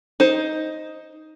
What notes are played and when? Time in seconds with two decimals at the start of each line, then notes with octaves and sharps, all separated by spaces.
0.20 D#4 C5